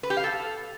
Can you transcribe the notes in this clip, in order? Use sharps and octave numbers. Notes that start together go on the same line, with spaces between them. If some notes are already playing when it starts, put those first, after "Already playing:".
B4
G4
F5
A4